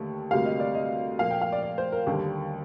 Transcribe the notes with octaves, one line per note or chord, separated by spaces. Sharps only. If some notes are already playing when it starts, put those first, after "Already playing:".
Already playing: D#2 D3 A3
D2 C3 G3 A#3 F5
D#5
D5
D#5
A#2 F3 A#3 F5
G5
F5
D5
D5
C5
A#4
D#2 D3 G3